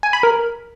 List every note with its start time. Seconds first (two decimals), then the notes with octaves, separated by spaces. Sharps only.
0.03 G#5
0.13 B5
0.23 A#4